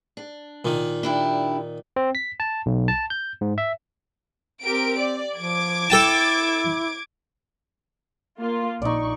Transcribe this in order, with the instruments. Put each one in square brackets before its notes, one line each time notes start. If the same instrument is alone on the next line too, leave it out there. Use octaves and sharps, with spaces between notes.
[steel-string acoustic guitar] D4
[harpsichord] A#2 D#3
[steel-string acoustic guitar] D4 E4 G4
[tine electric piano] C4
B6
A5
B1
A5
G6
G#2
E5
[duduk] C4 [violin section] G4 A#4 D7
[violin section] D5
[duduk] F3 [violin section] D6 G#6 D7
[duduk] E4 [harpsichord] A4 G5 A5
[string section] A#3 F4
[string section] A#1 C#6 [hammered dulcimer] D#4 D5